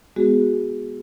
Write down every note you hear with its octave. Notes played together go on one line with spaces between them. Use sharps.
G#3 B3 F#4 G#4